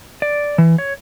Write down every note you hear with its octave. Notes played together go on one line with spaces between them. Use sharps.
D5
E3
C#5